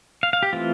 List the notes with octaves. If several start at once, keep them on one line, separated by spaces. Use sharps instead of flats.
F5
F5
G4
E3 A3 C4 F4